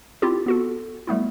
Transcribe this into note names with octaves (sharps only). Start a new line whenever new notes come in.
C4 E4 F4 G4
B3 F#4 A4
G3 A3 B3 E4